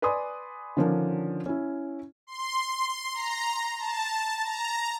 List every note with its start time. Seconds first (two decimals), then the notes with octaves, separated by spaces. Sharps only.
0.02 B4 D5 G#5 B5 C6 D#6
0.77 D3 D#3 F3 C#4 D4 A#4
1.46 C#4 E4
2.27 C6
3.14 A#5
3.79 A5
4.44 A#5